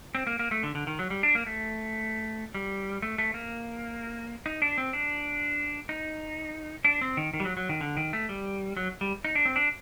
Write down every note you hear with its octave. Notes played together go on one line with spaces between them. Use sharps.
C4
A#3
A#3
A3
D3
D3
D#3
F#3
G3
D4
A#3
A3
G3
A3
A3
A#3
D#4
D4
C4
D4
D#4
D4
C4
D#3
D#3
G3
F#3
F#3
D#3
D3
D#3
A3
G3
F#3
G3
D#4
D4
C4
D4